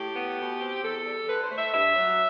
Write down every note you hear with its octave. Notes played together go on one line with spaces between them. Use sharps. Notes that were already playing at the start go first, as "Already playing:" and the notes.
Already playing: A2 G4
B3
B2
C4
E2 A4
G3
D3 B4
C5
A3
E5
G2 E5
F#3